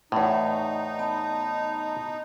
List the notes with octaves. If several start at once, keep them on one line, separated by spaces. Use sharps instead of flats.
E2 A2 D#4
B3 A5 B5